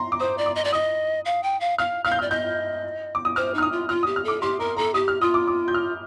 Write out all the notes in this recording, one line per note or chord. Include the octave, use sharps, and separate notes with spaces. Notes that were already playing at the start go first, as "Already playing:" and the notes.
Already playing: A#5 C6
D6
C5 D#6
D5
D6
D#5
D5
D#5 D#6
F5
G5
F5
F5 F6
F5 F6
G6
D5 F6
D#5 G6
D6
D#6
C5 F6
D#4 F6
D#6
F4
F4 F6
D#6
G4
F6
A4 D6
G4 C6
A#4 A#5
A4 A#5
G4 D#6
F6
F4 D#6
D6
D6
G6
F6